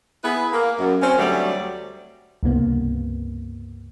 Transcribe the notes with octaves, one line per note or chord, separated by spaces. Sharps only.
B3 E4 G#4 B4
A#3
F#2
C4 C#4
D2 F#3 G3 A3 D5
C#2 G2 C3 A#3 B3